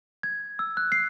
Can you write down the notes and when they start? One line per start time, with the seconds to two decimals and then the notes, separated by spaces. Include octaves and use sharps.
0.23 G#6
0.59 E6
0.77 F#6
0.92 C7